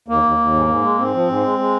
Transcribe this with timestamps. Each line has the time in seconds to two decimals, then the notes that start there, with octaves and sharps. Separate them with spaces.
0.08 D#2 A#3
0.23 D#2
0.38 D#2
0.53 G#2
0.68 G#2
0.83 G#3
0.98 G#2 C4
1.14 F3
1.28 G#2
1.43 G#3
1.59 G#3